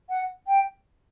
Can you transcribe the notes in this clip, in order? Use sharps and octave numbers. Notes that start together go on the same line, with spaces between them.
F#5
G5